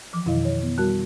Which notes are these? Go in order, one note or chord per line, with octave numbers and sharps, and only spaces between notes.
E3 F3 D6
F2 B2 D#3 E4 D#5 F5
C#5
B3
G3 F#4 A#4 A5 F#6